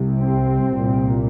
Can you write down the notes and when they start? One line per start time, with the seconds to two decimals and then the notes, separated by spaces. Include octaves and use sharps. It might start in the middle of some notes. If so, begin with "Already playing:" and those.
Already playing: C2 C3
0.17 C4
0.75 C2 A#2